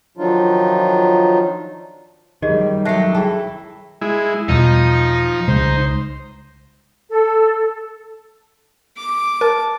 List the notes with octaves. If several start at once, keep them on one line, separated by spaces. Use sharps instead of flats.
D#3 F3 F#3 D4 D#4 F4
F#2 D#3 G3 G4 G#4 D#5
F#3 G3 A3 G4 F#6 A#6 C7
E4 G#4 A4 G5
G#3 E4
E2 B2 F3 G3 D#4
C2 C#3 G#3 C5
A4
D6
A#4 A5